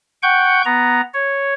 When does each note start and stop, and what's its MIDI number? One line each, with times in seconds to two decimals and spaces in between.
0.23 0.62 78
0.23 0.62 79
0.23 0.62 85
0.23 0.62 91
0.65 1.01 59
0.65 1.01 82
1.14 1.54 73